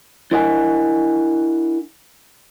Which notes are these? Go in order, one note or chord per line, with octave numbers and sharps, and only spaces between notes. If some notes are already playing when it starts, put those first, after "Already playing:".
D4 E4 A#4 D#5 F#5 G#5